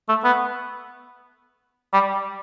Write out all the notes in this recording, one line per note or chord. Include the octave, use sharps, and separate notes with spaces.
A3
B3
G3